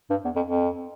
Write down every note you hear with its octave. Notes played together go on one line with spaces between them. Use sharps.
G2
E2
F2
F2